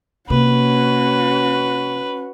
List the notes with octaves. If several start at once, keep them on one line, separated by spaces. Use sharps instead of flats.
C3 A#3 C#4 F#4 B4